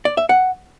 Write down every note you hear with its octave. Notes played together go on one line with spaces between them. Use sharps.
D5
E5
F#5